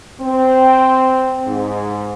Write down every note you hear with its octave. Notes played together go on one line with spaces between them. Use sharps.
C4
G#2